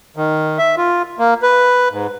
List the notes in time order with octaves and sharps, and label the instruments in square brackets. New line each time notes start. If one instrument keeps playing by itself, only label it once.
[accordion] D#3
E5
F4
A#3
B4
G#2